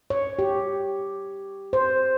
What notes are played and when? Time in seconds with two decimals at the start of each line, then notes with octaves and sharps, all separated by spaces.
0.10 C#5
0.39 G4
1.73 C5